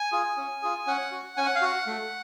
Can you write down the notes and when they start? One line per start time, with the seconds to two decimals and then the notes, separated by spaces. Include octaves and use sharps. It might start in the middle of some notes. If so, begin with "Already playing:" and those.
Already playing: G#5
0.12 F4 G#4
0.37 C#4
0.62 F4 G#4
0.87 C#4 F#5
1.12 F#4
1.37 C#4 G#5
1.46 F#5
1.55 F5
1.62 F#4 F#5
1.87 A3